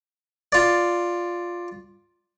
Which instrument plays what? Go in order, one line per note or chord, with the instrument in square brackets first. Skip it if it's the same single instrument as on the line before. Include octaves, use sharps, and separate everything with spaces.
[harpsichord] F4 D5